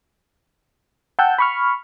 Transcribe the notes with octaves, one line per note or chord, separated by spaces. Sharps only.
F#5 G5 A5 E6 G6
B5 C#6 F6